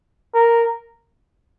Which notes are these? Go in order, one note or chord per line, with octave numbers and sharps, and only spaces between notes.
A#4